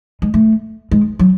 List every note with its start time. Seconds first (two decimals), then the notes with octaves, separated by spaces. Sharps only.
0.22 G#3
0.34 A3
0.91 G#3
1.19 F#3